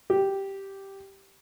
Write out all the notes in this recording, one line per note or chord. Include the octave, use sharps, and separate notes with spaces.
G4